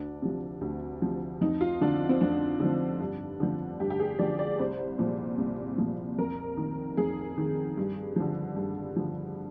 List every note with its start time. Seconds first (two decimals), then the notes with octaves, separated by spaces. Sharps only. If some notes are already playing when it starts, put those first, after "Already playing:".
Already playing: D2 D4
0.22 C3 F3
0.61 D2
1.02 C3 F3
1.41 F2 D#4
1.61 F4
1.81 D3 F3 D4
2.09 C4
2.21 F2 D4
2.60 D3 F3
3.00 G2
3.40 D3 F3
3.80 G2 G4
3.90 G4
4.00 G#4
4.19 D3 F3 D5
4.39 D5
4.59 C2 C5
4.99 A#2 F3
5.38 C2
5.78 A#2 F3
6.18 F2 A#4
6.57 D#3
6.97 F2 G#4
7.38 D#3
7.77 G2
8.16 D3 F3
8.56 G2
8.96 D3 F3